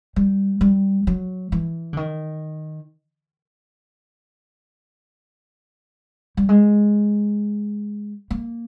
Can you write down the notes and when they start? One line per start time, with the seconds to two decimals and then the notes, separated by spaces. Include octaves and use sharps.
0.16 G3
0.61 G3
1.07 F#3
1.52 E3
1.93 D3
1.97 D#3
6.37 G3
6.49 G#3
8.31 A#3